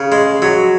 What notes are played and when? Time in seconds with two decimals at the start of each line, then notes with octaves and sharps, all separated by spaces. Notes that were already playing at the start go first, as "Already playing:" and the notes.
Already playing: C#3
0.12 G#3
0.42 F#3